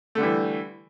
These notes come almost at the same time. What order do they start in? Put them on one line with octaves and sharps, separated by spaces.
A3 D3 G3 E3